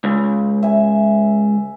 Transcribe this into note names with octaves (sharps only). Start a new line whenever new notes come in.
C#2
E5 G#5